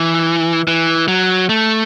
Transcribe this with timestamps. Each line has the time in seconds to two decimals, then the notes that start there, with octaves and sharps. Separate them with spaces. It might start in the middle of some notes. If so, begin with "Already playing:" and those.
Already playing: E3
0.68 E3
1.08 F#3
1.49 A3